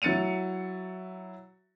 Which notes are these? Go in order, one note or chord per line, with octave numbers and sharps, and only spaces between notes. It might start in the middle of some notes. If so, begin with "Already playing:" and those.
F#3 E4 A6 C#7 D#7 F7